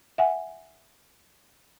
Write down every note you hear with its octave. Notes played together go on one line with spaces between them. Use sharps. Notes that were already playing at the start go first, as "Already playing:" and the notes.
E5 F#5 G#5